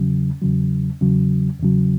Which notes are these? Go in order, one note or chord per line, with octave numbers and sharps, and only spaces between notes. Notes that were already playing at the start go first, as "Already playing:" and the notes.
Already playing: E2 C#3 F#3
E2 C#3 F#3
E2 C#3 F#3
E2 C#3 F#3